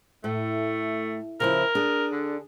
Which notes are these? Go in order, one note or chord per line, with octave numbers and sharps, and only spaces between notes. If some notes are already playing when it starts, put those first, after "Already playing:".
A2 A3
C#3 F3 E4 A#4
D4 G#4
D3